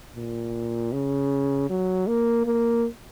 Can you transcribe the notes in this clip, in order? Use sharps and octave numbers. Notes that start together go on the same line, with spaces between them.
A#2
C#3
F#3
A#3
A#3